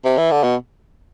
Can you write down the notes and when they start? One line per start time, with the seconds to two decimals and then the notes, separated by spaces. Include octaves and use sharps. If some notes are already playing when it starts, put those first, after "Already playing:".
0.05 C3
0.18 E3
0.31 D3
0.44 B2